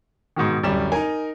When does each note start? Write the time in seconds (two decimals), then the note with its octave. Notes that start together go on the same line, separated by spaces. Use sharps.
0.36 G#2 B2 D#3
0.63 D1 F#2 G3 E7
0.92 D#4 A#4 G#5